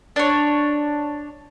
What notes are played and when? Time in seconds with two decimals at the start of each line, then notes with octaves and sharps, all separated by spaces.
0.16 D4 C#5